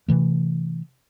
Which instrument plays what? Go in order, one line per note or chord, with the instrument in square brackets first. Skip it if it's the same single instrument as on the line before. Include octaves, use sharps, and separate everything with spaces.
[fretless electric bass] C3 E3 A3